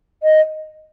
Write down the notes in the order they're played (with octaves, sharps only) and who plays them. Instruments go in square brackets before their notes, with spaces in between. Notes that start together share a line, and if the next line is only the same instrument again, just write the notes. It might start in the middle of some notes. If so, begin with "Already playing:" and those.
[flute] D#5